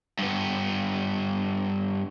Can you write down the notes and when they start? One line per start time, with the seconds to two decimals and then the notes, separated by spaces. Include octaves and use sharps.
0.19 G2 B3